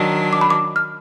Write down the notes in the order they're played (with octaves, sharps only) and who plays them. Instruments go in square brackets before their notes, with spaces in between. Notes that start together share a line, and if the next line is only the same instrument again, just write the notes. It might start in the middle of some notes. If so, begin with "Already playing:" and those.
Already playing: [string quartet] D#3 F#3 D4
[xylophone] D6
B5
D6
F6